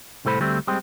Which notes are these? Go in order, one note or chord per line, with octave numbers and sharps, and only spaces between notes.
C2 A2 A4 C5 B5
D2 G3 A3 C4
G3 G#3 C4